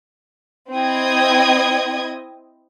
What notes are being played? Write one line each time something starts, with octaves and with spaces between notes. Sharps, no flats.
C4 E4 D#5 G5 D#6 G#6